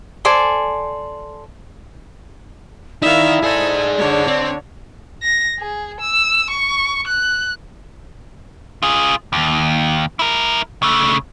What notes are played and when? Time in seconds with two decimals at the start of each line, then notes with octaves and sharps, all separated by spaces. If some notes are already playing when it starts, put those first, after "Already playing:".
0.25 A4 C5 D5 G#5
3.02 D#4 E4 A#4 D5 E5 F5
3.43 G#4 A4 C5 D5 G#5
3.98 D3 D4 C#5
4.28 C4
5.23 A#6
5.59 G#4
6.01 E6
6.51 C#6
7.08 F#6
8.83 F4 G#4
9.33 D#2
10.19 E4 A#4
10.83 C#3 A3